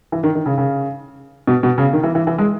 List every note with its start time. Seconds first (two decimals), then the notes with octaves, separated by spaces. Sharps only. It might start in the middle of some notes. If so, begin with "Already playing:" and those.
0.12 E3
0.23 D#3
0.35 D#3
0.46 C#3
0.58 C#3
1.47 B2
1.63 B2
1.78 C#3
1.93 D#3
2.03 E3
2.15 E3
2.27 E3
2.38 G#3